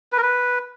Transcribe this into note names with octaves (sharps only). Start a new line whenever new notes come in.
B4
A#4
B4